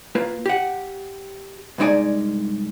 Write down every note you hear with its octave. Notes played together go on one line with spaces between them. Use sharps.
A#3 F4 B4
G4 F#5
C2 G2 G#3 D#4 D5 G#5